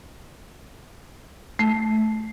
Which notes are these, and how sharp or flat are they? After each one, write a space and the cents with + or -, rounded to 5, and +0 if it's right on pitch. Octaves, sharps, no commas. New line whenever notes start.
A3 -15